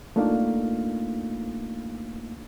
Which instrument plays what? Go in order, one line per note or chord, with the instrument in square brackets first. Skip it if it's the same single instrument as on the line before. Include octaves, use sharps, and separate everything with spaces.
[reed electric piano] A3 A#3 D4 D#4 F4 F5